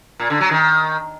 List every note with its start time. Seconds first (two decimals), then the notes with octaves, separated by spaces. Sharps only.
0.20 A#2
0.30 D3
0.41 F#3
0.51 D#3